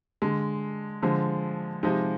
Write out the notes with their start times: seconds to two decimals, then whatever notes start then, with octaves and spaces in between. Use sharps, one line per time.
0.22 D3 G#3
1.02 D3 F3 G#3
1.83 C3 F3 G#3 D#4